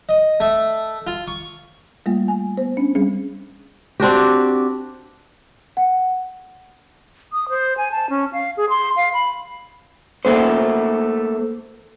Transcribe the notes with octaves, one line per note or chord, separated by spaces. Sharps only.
D#5
A3
F4
C#6
G3 A3 A#3 F4
G#5
B3 C5
C#4 D4
G3 C4 C#4 G#4
C4 D4 F#4 G4
F#5
D#6
C5
G#5
A5
C#4
F5
G#4
C6
F5
B5
A3 A#3 C5